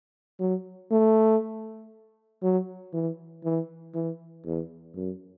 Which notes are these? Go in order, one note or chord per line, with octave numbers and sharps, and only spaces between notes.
F#3
A3
F#3
E3
E3
E3
E2
F#2